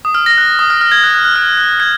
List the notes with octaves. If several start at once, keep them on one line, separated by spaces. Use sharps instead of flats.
D#6
F6
A#6
F#6
D#6
F6
F6
G#6
F#6
F#6
F#6
F6
F#6
G#6